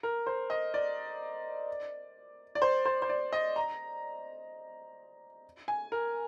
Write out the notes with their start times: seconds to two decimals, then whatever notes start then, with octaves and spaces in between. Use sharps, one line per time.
0.03 A#4
0.26 C5
0.50 D#5
0.74 D5
2.55 D5
2.62 C5
2.85 C5
3.02 C5
3.09 D5
3.33 D#5
3.56 A#5
5.68 G#5
5.92 A#4